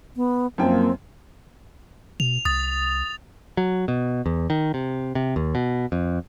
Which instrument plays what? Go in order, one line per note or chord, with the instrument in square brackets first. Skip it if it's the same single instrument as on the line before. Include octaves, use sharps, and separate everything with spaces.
[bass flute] B3
[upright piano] F#2 F3 G5 [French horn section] A#3 [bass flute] C4
[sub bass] B2 [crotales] F7
[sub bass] C2 [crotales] D#6 A6
[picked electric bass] F#3
B2
E2
D#3
C3
C3
D#2
B2
F2